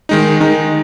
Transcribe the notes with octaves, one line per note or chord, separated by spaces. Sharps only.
D#3 G#3 D#4
D#3 G#3 D#4